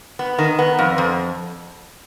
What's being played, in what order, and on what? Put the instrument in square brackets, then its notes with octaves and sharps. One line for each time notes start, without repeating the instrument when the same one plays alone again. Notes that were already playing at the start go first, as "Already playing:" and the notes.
[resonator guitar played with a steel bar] B3
D#3
B3
F2
F2